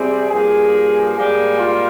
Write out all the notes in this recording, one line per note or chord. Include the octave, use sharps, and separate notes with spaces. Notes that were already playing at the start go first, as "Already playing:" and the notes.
Already playing: C3 G3 C4 G#4
G2 F3 A#3 G#4
G#2 G3 A#3 G#4
F4